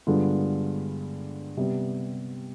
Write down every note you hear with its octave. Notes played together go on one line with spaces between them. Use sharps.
G2 D3 G#3 B3 F4
C3 G3 B3